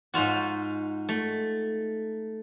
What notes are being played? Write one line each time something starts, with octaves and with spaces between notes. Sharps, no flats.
G#2 D#4 F4 F#4
A3